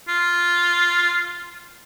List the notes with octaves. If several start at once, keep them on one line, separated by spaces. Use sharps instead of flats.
F4